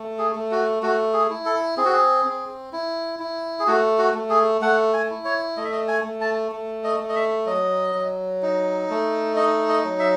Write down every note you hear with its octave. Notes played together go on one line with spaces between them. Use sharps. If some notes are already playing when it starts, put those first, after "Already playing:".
Already playing: A3
G#4
A3
F#4
A3 F#4
G#4
E4
A4
C4 G#4
F#4
G#4
C4
E4
E4
G#4
A3 F#4
F#4
A3
G#4
A3 F#5
G#5
E4
C#5
A3 D#5
E5
D#5
G#5
A3
A5
A3
D#5
A3
D#5
E5
F#3 D#5
F#3
D#4
A3
D#4 D#5
D#5
F#3
E5